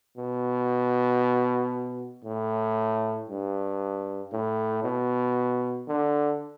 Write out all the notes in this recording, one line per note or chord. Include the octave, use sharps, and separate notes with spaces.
B2
A2
G2
A2
B2
D3